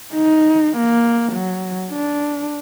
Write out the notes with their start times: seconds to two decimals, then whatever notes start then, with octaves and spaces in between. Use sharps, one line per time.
0.13 D#4
0.76 A#3
1.32 F#3
1.91 D4